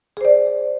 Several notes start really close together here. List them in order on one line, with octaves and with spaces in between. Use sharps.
G#4 C5 D5